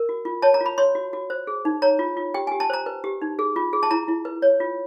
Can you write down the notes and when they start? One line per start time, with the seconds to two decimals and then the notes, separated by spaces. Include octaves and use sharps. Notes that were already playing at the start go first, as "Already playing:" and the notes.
Already playing: A#4
0.09 F#4
0.25 F4
0.42 C#5 A5
0.54 A#5
0.60 F4
0.66 B5
0.78 C#5 C6
0.95 F#4
1.13 F#4
1.30 C5
1.47 G#4
1.65 D#4
1.82 C#5 A#5
1.99 F4
2.17 F4
2.34 G4 G5
2.47 G#5
2.52 G4
2.60 A5
2.70 C5 A#5
2.86 B4
3.04 G4
3.22 D#4
3.39 G#4
3.56 F4
3.73 G#4
3.83 A5
3.91 E4 A#5
4.08 E4
4.25 B4
4.42 C#5
4.60 F4